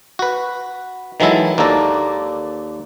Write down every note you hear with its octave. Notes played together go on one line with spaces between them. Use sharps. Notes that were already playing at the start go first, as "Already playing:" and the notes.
F#4 B4
D#3 E3 F#3 G#3 E4 A4
D#2 A#3 D4 A4 A#5